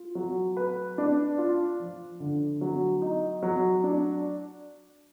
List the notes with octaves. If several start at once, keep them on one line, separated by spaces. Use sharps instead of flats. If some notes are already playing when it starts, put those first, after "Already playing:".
Already playing: F4
F#3
B4
D4
F4
F3
D3
F#3
D#4
F#3
D4